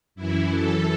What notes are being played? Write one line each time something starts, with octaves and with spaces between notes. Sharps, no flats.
F#2 E3 E4
F#2 E3 A4